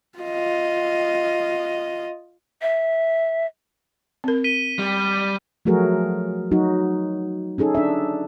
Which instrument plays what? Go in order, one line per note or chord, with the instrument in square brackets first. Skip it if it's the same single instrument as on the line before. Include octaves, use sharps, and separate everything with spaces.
[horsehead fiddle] F4 D#5
[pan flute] E5
[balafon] C4 A#4
[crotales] B6 D#7 G7
[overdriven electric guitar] G3
[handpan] F3 F#3 A3 F#4 G#4 A#4
F#3 D#4 F#4
C#4 D#4 G#4 A4
D4 E5